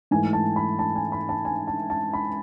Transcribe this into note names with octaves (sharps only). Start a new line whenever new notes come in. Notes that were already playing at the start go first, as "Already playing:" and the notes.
G#2 E3 A3 G#5
A5
B5
A5
G#5
B5
A5
G#5
A5
A5
B5